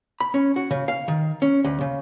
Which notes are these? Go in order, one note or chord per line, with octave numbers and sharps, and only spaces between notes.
B5
C#4
F#4
C#3
F5
D#3
C#4
D2
C#3